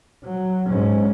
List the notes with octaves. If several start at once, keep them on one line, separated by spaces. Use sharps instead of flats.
F#3
G#2 C#4